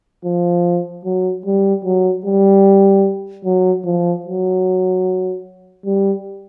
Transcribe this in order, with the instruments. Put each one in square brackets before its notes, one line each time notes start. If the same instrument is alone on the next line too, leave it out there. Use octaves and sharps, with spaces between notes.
[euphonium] F3
F#3
G3
F#3
G3
F#3
F3
F#3
G3